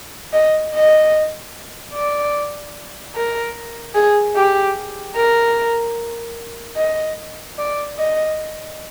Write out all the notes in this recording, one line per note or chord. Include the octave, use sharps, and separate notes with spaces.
D#5
D#5
D5
A#4
G#4
G4
A#4
D#5
D5
D#5